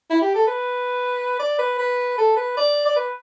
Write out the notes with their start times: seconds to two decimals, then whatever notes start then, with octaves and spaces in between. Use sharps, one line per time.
0.10 E4
0.21 G4
0.35 A4
0.47 B4
1.39 D5
1.58 B4
1.78 B4
2.18 A4
2.37 B4
2.57 D5
2.85 D5
2.96 B4